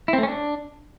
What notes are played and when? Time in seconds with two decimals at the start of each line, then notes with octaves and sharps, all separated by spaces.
0.08 E4
0.13 C4
0.18 A3
0.23 C#4
0.28 D4